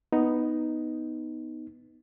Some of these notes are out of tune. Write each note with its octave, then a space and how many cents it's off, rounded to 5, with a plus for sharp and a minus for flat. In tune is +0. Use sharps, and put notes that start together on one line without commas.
B3 +0 D#4 +0